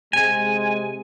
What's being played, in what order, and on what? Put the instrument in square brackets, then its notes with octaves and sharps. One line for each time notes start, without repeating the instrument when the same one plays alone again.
[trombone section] C3 G#3 [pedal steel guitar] G#5